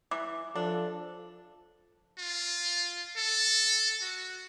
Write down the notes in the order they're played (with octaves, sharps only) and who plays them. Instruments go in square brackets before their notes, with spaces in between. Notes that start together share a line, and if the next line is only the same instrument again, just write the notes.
[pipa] E3 [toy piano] D6
[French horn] F3 [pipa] D4 [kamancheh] A4
[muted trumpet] F4
A4
F#4